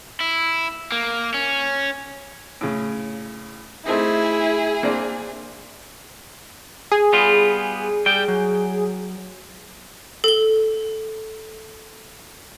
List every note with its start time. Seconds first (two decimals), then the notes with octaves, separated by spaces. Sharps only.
0.21 E4
0.92 A#3
1.34 C#4
2.61 A2 C#3
3.86 A3 C4 D#4 E4 G#4
4.83 A#3 C4 D4
6.92 G#4
7.13 G3 B3 F4
8.06 G3 G5
8.28 F#3
10.24 A4 G7